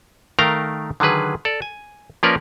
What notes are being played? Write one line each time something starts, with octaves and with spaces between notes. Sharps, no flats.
D#3 A3 A#4 F5 G5 A#5
D3 D#3 F#3 G#4 B4
A4 D5
G#5
F3 A#3 C#4 A#4 B4 D5